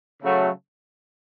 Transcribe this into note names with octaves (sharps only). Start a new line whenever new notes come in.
C#3 F#3 A3